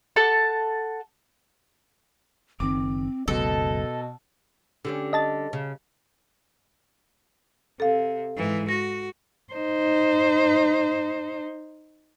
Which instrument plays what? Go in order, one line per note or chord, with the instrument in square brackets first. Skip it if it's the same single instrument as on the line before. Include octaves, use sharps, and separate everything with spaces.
[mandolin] A4 F#5 A5
[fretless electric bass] F#1 D#3 [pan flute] C4 [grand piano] D6
[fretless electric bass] F#1 C#2 F#2 [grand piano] B2 [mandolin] A4 [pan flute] D#5
[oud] D3 G3 C#4
[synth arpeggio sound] D#5 A5 A6
[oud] C#3
[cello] C3 [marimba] A4 F5
[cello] G#2 E3
[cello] F#4 [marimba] A#6
[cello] D#4 C5